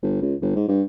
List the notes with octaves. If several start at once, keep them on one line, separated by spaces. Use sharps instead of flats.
G1
C#2
G1
G#2
G2